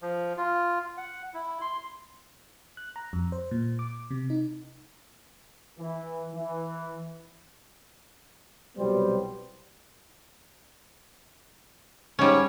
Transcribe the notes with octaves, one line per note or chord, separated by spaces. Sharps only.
F3
F4
F#5
E4
C6
F#6
A#5
F2
C5
A#2
D6
C3
D#4
E3
E3
C2 B2 F#3 G3 B3 C5
G#2 G3 C#4 C#5